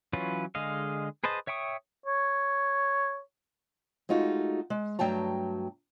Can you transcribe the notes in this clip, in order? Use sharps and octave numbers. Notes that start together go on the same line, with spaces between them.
E3 F#3 C#4 F4 B4
D3 G#3 G#4 D#5 F5
G#4 B4 C5 D#5 A5
C#5 E5 G5 C#6 D#6
C#5
G#3 A3 D#4 F4 F#4
G#3
G2 F#3 A3 G5 A5 A#5